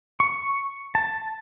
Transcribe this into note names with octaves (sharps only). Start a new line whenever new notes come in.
C#6
A5